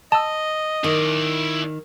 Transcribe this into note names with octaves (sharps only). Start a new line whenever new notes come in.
D#5 A5 E6
D#3 E4 D5